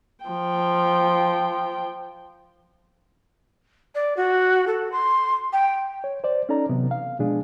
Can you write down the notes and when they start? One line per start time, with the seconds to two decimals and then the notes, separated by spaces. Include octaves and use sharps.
0.25 F3 G5
3.95 D5
4.17 F#4
4.67 A4
4.92 C6
5.53 G5
6.04 C#5
6.24 C5 D5
6.49 C#4 D#4 A4 D5 A#5
6.69 C3 E3 F#3 B3
6.91 F5
7.19 B2 F3 G#3 D4 G#4